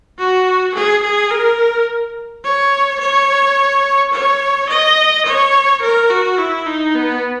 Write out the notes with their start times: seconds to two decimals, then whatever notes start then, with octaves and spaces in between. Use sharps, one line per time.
0.19 F#4
0.75 G#4
1.03 G#4
1.31 A#4
2.44 C#5
3.00 C#5
4.13 C#5
4.69 D#5
5.26 C#5
5.82 A#4
6.10 F#4
6.38 E4
6.66 D#4
6.95 B3